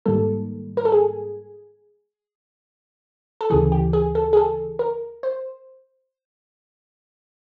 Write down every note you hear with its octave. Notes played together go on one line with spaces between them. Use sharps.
G#2 D#3 G3 A#3 A4
A#4
A4
G#4
A4
D2 C#3 E3 G#4
G4
G#4
A4
G#4
A4
A#4
C5